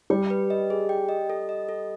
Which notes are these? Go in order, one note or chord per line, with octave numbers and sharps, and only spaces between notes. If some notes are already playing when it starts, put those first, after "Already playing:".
G3 G5
B4
D#5
G#4
G5
D#5
A4
D#5
A4